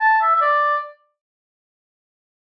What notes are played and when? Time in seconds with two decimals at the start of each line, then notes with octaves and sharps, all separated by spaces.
0.01 A5
0.21 E5
0.36 E5
0.41 D5